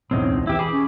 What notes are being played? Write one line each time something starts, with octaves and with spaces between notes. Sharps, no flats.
B1 E2 A2 C4 C#4 D#4
C#2
E3 E4 G4 E5
G#4 B5 D6
C#4